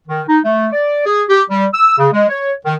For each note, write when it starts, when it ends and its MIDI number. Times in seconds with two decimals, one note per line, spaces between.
0.08 0.21 51
0.28 0.38 63
0.44 0.68 57
0.73 1.03 74
1.06 1.23 68
1.29 1.42 67
1.50 1.66 55
1.74 1.96 88
1.98 2.08 49
2.13 2.25 56
2.29 2.52 73
2.65 2.75 51